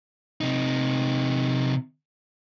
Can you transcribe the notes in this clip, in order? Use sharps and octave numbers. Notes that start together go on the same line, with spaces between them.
C3 D#4